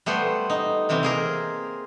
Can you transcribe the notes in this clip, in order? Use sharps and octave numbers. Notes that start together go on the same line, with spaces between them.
G3 A3 B3 C5
D#4
C3 E3 G3 C4
A#3 G#4 A#4